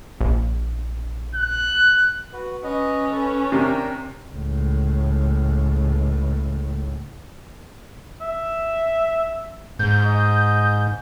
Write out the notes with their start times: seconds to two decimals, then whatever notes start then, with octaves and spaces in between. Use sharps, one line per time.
0.21 A#1
1.35 F#6
2.33 F#4 B4
2.64 C#4 B4 D#5
3.12 A4 B4
3.52 C3 D4 A#4 G5
4.29 C#2 A2
8.21 E5
9.79 G#2 G6
10.06 D#5